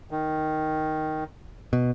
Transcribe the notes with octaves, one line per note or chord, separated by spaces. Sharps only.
D#3
B2